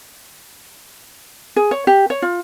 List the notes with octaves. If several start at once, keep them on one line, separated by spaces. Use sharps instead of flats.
G#4
C#5
G4
C#5
F4